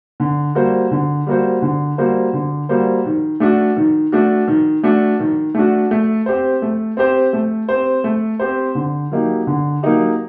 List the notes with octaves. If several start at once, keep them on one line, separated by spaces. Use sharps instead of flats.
D3
G3 A#3 F#4 C5
D3
G3 A#3 F#4 C5
D3
G3 A#3 F#4 C5
D3
G3 A#3 F#4 C5
D#3
A3 D4 F#4
D#3
A3 D4 F#4
D#3
A3 D4 F#4
D#3
A3 D4 F#4
A3
C4 G4 C5
A3
C4 G4 C5
A3
C4 G4 C5
A3
C4 G4 C5
D3
F#3 A#3 D#4 G4
D3
F#3 A#3 D#4 G4